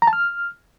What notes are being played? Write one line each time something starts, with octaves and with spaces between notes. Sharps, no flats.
A#5
A5
F6